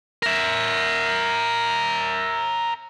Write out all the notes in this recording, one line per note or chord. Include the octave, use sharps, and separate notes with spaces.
A#4 E5